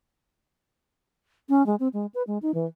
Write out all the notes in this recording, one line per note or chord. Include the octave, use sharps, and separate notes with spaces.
C#4
G#3
C4
G#3
B4
G#3
D#4
E3